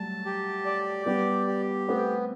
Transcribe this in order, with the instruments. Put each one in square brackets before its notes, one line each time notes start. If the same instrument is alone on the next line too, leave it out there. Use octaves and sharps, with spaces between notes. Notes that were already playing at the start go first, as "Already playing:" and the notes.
Already playing: [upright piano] F#3 G3 A3 [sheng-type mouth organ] A5
[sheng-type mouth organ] G4
D5
[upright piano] G3 B3 [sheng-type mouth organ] G4
[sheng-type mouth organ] G4
[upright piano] A3 C4 [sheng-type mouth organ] B3